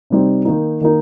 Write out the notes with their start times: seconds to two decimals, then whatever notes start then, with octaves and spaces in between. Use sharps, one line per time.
0.10 C3 G3 C4 D#4
0.45 D#3 A#3 D#4
0.81 D#3 A#3 D#4